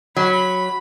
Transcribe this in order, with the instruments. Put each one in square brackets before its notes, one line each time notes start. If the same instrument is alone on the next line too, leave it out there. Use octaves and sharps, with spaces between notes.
[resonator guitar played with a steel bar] F#3 [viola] B5